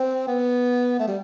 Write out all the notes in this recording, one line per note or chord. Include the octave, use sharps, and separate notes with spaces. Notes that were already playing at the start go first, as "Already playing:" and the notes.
Already playing: C4
B3
A3
G3